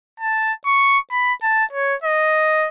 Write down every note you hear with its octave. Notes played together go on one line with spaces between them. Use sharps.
A5
C#6
B5
A5
C#5
D#5